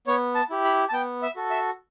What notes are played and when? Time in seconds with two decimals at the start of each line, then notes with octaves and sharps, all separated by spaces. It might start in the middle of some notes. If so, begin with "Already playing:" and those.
0.07 B3 C#5
0.35 A5
0.50 E4 G4
0.64 B5
0.89 A5
0.93 B3 G5
1.22 E5
1.36 F#4 A4
1.50 E5